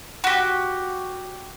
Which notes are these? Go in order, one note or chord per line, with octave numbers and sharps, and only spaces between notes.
F#4 G4